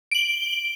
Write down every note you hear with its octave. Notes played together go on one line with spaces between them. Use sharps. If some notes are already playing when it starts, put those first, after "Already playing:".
D7 F#7 G7